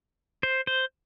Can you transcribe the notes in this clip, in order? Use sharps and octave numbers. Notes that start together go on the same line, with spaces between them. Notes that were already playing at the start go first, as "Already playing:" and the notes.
C5
C5